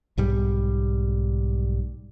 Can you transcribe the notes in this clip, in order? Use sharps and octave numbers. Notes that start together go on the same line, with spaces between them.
B1 G#2 G3